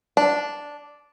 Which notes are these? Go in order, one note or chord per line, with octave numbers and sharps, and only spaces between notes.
D4